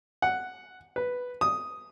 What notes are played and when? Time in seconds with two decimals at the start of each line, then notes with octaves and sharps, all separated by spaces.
0.22 F#5
0.96 B4
1.41 D#6